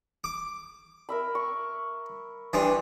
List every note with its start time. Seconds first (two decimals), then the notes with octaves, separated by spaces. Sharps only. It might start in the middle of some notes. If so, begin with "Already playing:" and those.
0.24 D6
1.09 A#4 E5 B5
1.35 C#6
2.53 E3 G3 D4 C6 D#6